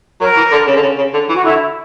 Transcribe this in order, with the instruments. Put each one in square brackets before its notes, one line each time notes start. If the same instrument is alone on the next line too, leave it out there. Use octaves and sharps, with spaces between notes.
[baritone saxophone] F#3 [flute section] A#4
[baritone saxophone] E3
D3
C#3
D3
C#3
C#3
D3
E3
[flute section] F#4
[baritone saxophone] D3 [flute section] E4